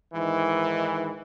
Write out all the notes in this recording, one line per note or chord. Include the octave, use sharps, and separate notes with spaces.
G#2 D#3 E3